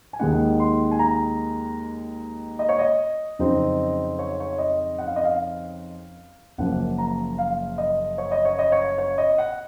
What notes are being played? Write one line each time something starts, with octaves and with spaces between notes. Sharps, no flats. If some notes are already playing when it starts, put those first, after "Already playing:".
G#5
D#2 D#3 G#3 D#4 F#5
C6
G#5
A#5
D#5
C#5
D#5
F2 C#3 F#3 C4 D#4
C#5
C#5
D#5
F#5
F5
D#5
F5
F#1 F#2 F3 A#3 F#5
A#5
F5
D#5
C#5
D#5
C#5
D#5
C#5
C#5
D#5
F#5